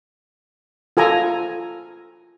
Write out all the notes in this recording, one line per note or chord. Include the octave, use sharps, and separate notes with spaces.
F4 A4 G#5 A#5